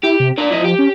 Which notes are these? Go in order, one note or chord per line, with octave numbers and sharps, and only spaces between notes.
E4 G4
C3
D4 A#4 D5
F3 E4 D#5
G4
C#4